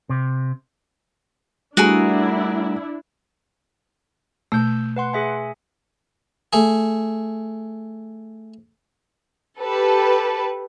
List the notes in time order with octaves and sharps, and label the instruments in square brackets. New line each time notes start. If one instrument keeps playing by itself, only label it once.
[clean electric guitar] C3
[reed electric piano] G3 A3 [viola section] D4 E4 [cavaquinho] F#4 G#4 A#4
[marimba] B2 A3 [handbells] E6 G6
[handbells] B4 F#5 C6
G#4 E5 G#5
[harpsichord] A3 G#4
[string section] G4 A4 B4